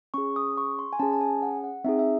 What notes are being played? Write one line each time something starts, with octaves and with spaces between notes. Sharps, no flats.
C#4 G#4 C#6
D#6
C#6
C6
G#5
C#4 G#4 A5
A5
G#5
F#5
F#5
C4 D#4 G#4 E5
E5